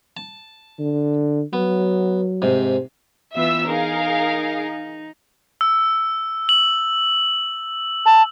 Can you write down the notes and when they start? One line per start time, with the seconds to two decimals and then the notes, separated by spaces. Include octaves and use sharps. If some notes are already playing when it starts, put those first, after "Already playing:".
0.17 A5
0.79 D3
1.53 F#3 B3
2.42 G#2 C3
3.35 E3 B3 F4 E5 E6
3.66 D#4 G#4 A#4 F5
5.61 E6
6.49 F#7
8.06 A5